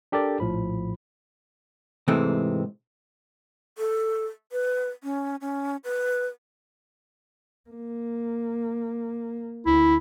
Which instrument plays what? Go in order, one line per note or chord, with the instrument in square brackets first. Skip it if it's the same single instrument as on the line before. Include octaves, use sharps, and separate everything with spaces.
[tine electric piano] D4 G4 A4 A#4 D5
A#1 A2 F3 B5
[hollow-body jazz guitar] G#2 C3 E3 G#3 A3 C4
[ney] A4
B4
C#4
C#4
B4
[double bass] A#3
[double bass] D2 [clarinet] E4